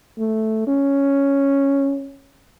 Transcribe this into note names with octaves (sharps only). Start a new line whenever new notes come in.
A3
C#4